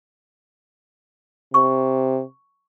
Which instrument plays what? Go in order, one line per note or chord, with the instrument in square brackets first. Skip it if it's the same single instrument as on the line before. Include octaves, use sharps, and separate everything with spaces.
[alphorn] C3 [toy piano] C#6